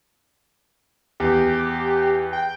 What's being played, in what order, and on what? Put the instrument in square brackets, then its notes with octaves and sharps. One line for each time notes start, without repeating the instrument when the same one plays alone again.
[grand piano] E2 [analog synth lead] G4
[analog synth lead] G5